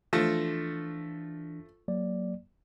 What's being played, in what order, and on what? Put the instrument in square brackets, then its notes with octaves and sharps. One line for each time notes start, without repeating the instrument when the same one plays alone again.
[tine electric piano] E3 D4 A#6 [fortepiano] F3 A3
[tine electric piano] F#3 A#3 D5